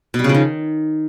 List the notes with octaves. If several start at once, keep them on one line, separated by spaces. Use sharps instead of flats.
B2
G3
C#3
F3
D#3